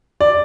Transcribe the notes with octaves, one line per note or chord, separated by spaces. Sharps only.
D5